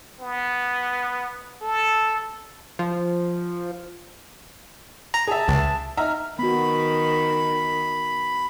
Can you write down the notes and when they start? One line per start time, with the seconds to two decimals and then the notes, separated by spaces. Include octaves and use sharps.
0.21 B3
1.62 A4
2.79 F3
5.14 A#5
5.28 G#4 E5 A5
5.48 C#2
5.97 D#4 E5 A#5 F6
6.39 D#3 B3 F#4 B5